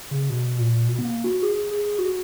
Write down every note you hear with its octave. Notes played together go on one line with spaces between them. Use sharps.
C#3
B2
A#2
B2
B3
A#3
F#4
G#4
G#4
F#4